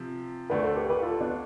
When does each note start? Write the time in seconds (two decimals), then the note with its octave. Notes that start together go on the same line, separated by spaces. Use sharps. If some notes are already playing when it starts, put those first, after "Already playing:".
Already playing: C3 F3
0.50 D2 D3 A3 B4 D5
0.63 A4 C5
0.76 G4 B4
0.90 G4 B4
1.02 F4 A4
1.21 B3 D4